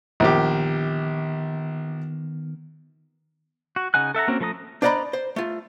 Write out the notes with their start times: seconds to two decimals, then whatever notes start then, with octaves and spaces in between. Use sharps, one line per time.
0.20 A#1 D#3 B3 G4 F6
3.76 F#4
3.94 C#3 D#4 F#5 G#5 F#6
4.15 A4 E5 F#5 A#5
4.28 A#3 C4 C#4 F#4 A#4
4.40 F3 A3 A4 A#5 D#6
4.82 D4 C5 D5 D#5 A#5 B5
5.13 C5
5.36 A3 F4